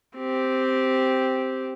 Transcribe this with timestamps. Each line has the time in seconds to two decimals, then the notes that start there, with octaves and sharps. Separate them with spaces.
0.17 C4 G4